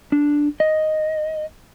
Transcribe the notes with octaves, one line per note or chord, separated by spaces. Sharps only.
D4
D#5